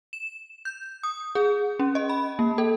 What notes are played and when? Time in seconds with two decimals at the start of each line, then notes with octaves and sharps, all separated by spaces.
0.13 E7
0.65 G6
1.03 D#6
1.35 G#4
1.79 C#4
1.95 D#5
2.09 B5
2.39 A#3
2.58 A4